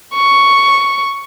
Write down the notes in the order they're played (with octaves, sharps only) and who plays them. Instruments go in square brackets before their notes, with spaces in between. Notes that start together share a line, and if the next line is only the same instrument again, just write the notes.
[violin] C#6